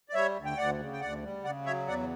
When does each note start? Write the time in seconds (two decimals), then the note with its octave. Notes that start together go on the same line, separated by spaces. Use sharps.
0.09 D5
0.14 G3 C#5 E5
0.35 D2
0.45 G5
0.57 D2 D5 F#5
0.79 C#3
0.93 G5
1.00 D2 D5 F#5
1.23 G3
1.44 C#3 D5 F#5
1.66 F#3 C#5 E5
1.87 E2 D5 F#5